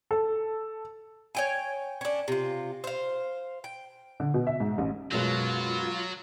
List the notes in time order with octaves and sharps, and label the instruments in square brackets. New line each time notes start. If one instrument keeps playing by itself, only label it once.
[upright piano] A4
[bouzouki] C#5 G5 G#5
C#4 D4
C3 F4
C5 F5
G5
[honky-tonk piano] D3
B2
E5
G#2
A1
[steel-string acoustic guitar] F#2 B2 G#3 [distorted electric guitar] F#3 [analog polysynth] F4